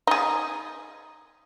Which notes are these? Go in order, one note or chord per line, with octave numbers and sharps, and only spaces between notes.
D#4 G#4